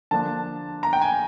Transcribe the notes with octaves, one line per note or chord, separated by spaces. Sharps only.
D3 F3 A#3 D4 A5
A#5
G5
G#5